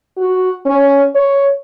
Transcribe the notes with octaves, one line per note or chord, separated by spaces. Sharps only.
F#4
C#4
C#5